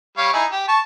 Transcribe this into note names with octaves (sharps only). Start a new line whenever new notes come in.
G3 C#5 F5
D#4 E4 G#4
G4
A5 C#6